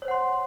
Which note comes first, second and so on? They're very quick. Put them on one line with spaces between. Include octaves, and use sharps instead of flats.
C#5 C5 F#5 C6